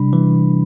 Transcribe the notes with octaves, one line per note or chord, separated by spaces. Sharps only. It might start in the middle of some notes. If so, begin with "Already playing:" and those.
Already playing: C3 G3 D4 B5
E3